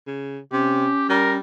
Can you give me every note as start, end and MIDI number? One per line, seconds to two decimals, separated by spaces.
0.07 0.39 49
0.52 0.88 48
0.52 1.38 61
0.52 1.07 67
1.09 1.39 55
1.09 1.32 70